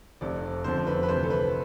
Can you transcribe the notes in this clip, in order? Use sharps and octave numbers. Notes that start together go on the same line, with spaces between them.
F1 F2 C3 D5
F1 F2 D3 F3 C5
B4
B4
D2 C3 E3 C5
A4
B4